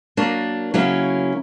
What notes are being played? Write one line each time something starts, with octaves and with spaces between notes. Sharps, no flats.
F#3 A#3 D4
C#3 F#3 A#3 C#4 E4